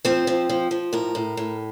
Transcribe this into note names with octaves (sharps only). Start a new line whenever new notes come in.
F3 C4
F3
F3
F3
A2 A#4
A2
A2